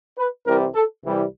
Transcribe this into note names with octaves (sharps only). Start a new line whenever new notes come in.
B4
C2 C3 E3 G3 A#4
A4
C2 C3 E3 G3